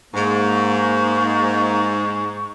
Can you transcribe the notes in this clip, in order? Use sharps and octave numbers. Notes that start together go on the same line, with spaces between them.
G#2 A#3 C#6